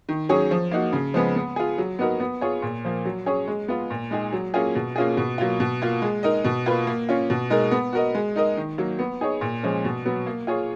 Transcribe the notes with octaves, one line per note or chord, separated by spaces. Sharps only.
D#3
F#3 C#4 G#4 C#5
F3
A#3 D#4 F#4
C#3
F3 G#3 B3
B3
F4 G#4
F#3
B3 D#4 F#4 A#4
B3
F4 G#4 C#5
A#2
F3 A#3
F#3
C#4 G#4 C#5
G#3
B3 F4
A#2
G#3 D#4 G#4
F#3
A#3 C#4 F4 G#4
B2
A#3 C#4 F4 G#4
B2
F#3 A#3 F4
B2
A#3 F4
G#3
D#4 A#4 D#5
B2
A#3 F4 B4
A#3
C#4 F4
B2
G#3 D#4 A#4
B3
F#4 A#4 D#5
G#3
D#4 A#4 D#5
D#3
F#3 A#3
B3
D#4 G#4 C#5
A#2
F3 G#3 C#4
B2
F#3 B3
A#3
F4 G#4 C#5